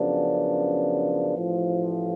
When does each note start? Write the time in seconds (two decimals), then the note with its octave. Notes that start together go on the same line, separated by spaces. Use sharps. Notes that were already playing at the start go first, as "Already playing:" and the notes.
Already playing: F#2 C#3 F3 B3 D4
1.37 A1 A2 F3